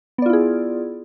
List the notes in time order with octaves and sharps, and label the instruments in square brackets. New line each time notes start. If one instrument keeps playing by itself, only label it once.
[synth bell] B3
D5
F4
E4
G#4